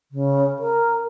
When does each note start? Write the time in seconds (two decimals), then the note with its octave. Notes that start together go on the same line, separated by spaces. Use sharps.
0.12 C#3
0.59 A#4